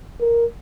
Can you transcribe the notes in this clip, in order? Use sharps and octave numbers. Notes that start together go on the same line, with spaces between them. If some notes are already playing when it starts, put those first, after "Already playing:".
A#4